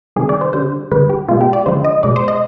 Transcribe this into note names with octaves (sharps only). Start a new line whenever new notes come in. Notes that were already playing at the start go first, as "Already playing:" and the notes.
C3 D#3 G3 G#4
D5
C5
D3 G3 C5
D3 G3 B4
G4
B2 G#3 F4
G4
D5
D3 F3 G#3 C5
D#5
B2 G#3 D5
C5
D#5